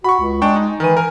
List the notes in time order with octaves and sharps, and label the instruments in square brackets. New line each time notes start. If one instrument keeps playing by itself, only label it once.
[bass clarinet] F#4 [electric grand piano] B5 C#6
[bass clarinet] C#2
[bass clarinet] G#3 [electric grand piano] D4 G5 C#6
[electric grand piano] D#4
[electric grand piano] D#3 D#7 [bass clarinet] E3
[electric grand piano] A#4 G#5